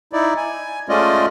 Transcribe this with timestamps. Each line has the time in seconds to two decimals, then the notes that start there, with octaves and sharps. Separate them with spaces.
0.13 D#4 E4 D5
0.37 G#5
0.89 G#3 A3 C#4 F4 D5 D#5